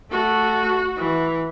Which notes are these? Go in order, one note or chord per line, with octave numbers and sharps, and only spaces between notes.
A3 F#4
E3